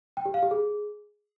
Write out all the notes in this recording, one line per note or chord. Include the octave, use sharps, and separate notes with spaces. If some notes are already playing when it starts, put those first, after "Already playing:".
G5
G4
F5
G4
G#4